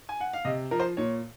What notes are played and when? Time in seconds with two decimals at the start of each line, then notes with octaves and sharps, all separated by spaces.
0.09 G#5
0.20 F#5
0.33 F5
0.45 C3 D#5
0.71 F3 A#4
0.80 C5
0.97 A#2 C#5